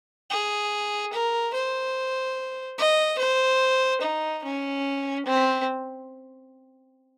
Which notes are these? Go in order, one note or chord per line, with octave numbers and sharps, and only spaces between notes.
G#4
A#4
C5
D#5
C5
D#4
C#4
C4